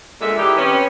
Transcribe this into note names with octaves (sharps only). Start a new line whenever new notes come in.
A#2 D3 G#3 E5
E3 D#4 G4
C3 B3 C#4